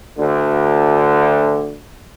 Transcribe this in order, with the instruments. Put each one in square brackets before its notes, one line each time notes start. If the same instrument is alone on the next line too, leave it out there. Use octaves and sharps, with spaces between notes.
[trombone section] D2 D3